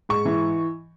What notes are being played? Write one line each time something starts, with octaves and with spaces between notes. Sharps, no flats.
G#2 C#6
E3